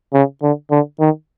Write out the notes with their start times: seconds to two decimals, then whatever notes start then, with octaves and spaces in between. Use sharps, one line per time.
0.13 C#3
0.42 D3
0.71 D3
1.00 D#3